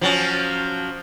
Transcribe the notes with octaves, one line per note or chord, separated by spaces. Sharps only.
F3 F#3 C#4